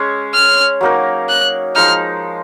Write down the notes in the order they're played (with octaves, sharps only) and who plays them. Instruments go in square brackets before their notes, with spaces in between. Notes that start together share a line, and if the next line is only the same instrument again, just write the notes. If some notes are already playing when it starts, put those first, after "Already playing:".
Already playing: [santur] G#3 C#4 G#4 C#5
[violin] F6
[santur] F#3 A#3 D#4 A#4
[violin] F#6
[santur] F3 G#3 D#4 [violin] F6